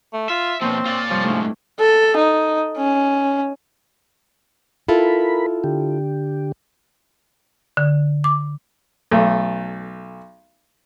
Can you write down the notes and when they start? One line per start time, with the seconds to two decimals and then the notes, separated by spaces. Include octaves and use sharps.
0.13 A3
0.30 F4 E5
0.61 B2 F3 A#3 C4 C#5
0.86 F4 D5
1.10 G2 C3 F3 C#5
1.23 C2 G#2 A3 D4 E4
1.80 A4
2.16 D#4
2.77 C#4
4.88 E4 F4 A4 A#4 B5
5.64 D3 G4
7.77 D3
8.24 D6
9.11 B1 A3